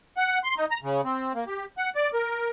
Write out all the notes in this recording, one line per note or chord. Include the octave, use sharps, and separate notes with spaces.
F#5
C6
D#4
A#5
C#3
C4
A#3
G4
F#5
D5
A#4